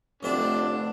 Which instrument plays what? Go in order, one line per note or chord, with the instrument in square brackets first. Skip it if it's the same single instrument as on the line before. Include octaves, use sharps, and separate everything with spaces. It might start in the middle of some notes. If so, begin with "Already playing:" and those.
[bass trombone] F1 [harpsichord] D2 C4 A5 [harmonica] D4